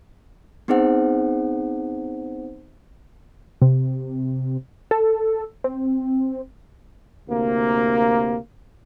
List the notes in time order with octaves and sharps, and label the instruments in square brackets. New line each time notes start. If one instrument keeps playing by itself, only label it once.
[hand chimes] B3 C4 D#4 G#4 C5 F#5
[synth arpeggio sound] C3
A4
C4
[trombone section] D2 C3 A#3